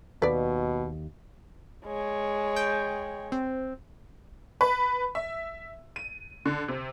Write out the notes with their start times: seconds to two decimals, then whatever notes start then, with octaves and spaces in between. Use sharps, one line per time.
0.22 D#2 B2 B4 D5
1.85 G#3 C#5
2.56 G5
3.32 C4
4.61 B4
5.15 E5
5.96 D#7
6.46 D3
6.68 C3